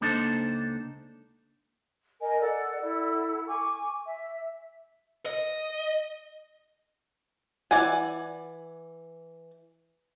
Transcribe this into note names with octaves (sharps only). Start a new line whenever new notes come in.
C#2 A#3 D4 D#4 A4 C5
A#4 D#5 G#5
A4 D5 F#5
E4 A4 F#5
G#5 C#6 D6
E5
D#5
E3 D5 F#5 G#5